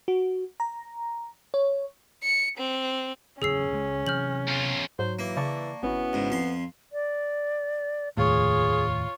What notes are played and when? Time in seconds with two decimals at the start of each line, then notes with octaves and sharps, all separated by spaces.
0.08 F#4
0.60 A#5
1.54 C#5
2.23 C#7
2.58 C4
3.42 F#1 E2 A2 C#4 G#4 E6 C7
3.72 C#2 G#3
4.07 C3 E3 F#3 F6 G6 F#7
4.48 E2 F4
4.99 G#2 F#3 C5
5.19 E3 A#3
5.37 C#3 D5 A5 C#6
5.83 G#1 B3 C#4 E4 F#4
6.13 C#2 G#2
6.30 F2 C6
6.92 D5
8.17 F1 D#2 A2 F4 G#4 C#5